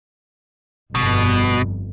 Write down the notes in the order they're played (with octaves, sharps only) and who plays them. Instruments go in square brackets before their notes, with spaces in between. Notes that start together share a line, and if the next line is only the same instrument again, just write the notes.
[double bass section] G1 F2 [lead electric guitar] B2